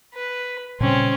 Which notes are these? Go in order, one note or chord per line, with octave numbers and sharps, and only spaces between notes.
B4
A#2 C#3 G3 C4 C#4